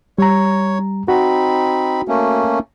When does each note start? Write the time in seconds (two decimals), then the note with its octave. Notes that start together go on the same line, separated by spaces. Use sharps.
0.18 G3 C#5 A#5
1.08 C4 D#4 F#4 B5
2.08 A3 A#3 C#4